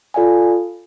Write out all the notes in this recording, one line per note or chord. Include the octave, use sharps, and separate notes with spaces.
F4 A4 D5 F5 G#5